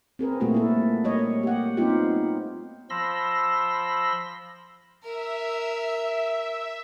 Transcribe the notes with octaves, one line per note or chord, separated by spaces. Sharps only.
C4 G#4 A#4 B4
A#2 G3 A3 A#3 F#4 G#4
E4 A4
G3 A#3 C#5 D#5
G4 F#5
G3 B3 C4 D#4 F4 G4
F3 B5 C6 E6 A#6
A#4 E5